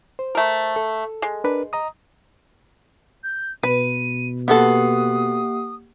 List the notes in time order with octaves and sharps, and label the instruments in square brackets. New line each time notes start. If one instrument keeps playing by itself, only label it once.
[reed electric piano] C5
[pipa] A3 A#4
[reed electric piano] A4
[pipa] G#3
[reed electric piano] D4 A#4 B4
D#5 A#5 D#6
[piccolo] G6
[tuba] B2 [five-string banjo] B4 [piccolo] D#7
[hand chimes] A#3 G4 F#5 [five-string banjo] B3 F#4 A4 [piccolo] D#6